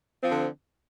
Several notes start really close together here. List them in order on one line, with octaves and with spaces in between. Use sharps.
C4 F3 D3